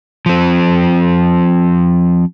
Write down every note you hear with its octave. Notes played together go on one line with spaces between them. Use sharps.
F3 C4